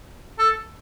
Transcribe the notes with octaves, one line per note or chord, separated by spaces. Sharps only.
A4